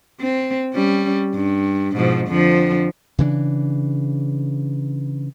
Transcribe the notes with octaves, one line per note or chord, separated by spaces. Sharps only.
C4
G3 C#4
G2
G#2 B2 F3
F2 D3 F3
C#3 E3 C#4 D4